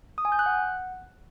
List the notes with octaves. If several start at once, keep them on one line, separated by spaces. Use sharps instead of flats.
D#6
G#5
G6
F#6
F#5